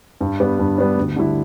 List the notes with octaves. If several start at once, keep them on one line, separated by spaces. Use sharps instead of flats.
G2
G3 B3 D4
G2
G3 B3 D4
D2
D3 G3 E4